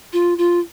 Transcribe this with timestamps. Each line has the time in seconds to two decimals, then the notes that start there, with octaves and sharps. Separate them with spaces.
0.13 F4
0.38 F4